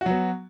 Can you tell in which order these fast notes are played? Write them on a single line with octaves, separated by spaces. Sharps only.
F#4 F#3 B3